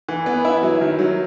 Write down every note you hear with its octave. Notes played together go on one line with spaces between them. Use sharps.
E3
B3
E4
F#3
D#3
F#3